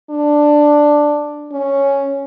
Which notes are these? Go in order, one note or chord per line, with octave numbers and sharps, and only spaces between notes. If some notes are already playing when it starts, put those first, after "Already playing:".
D4
C#4